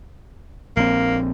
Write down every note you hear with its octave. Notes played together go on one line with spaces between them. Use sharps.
A#1 A#3 C4